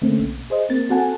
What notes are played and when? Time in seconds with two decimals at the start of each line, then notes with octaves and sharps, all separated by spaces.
0.02 D3 A3 A#3 C4 C#4
0.19 B1
0.50 G#4 C5 D#5
0.69 A#3 C4 A#4 A6
0.89 C4 F#4 A4 F#5 G#5 A5